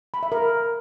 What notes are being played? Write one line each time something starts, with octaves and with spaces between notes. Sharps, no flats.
B5
E5
A#4